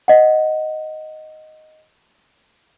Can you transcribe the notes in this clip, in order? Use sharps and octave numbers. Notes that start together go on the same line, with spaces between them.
D#5 F#5